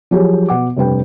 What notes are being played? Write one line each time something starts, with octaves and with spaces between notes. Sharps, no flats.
F3 F#3 G4 G#4 C#5
B2 F#5 D6
F1 G2 B4 G5